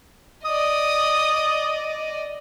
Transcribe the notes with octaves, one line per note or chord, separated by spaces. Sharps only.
D5 D#5 D#6